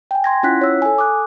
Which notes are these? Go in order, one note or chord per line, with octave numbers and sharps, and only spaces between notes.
G5 G#5
C6 G#6 A#6
C#4 E4 F4 F#5 F#6 B6
C#5 E6
A4 G#5
D6 D#6 F#6